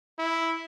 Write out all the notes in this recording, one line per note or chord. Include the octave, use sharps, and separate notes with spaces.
E4